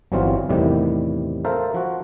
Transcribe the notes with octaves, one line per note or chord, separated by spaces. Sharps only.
G1 E3 F#3 G3 C4 F4
E2 A2 C3 D#3 G3
A4 A#4 C5 E5 F5 A#5
F3 F#4